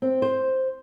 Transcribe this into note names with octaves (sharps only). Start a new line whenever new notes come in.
C4
C5